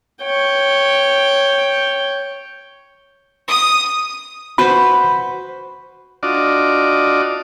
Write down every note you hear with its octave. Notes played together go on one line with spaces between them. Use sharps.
C#5 G5
D#6
F#4 B4 C5 B5
D4 F4 F#4 D5 D#5